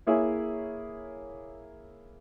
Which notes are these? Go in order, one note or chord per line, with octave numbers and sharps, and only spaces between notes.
A#3 E4 G#4 C#5 E5